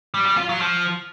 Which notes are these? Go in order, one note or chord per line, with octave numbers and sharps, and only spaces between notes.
G3
G3
F4
F#3
F3